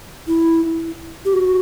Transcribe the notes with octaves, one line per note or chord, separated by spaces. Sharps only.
E4
G4
F#4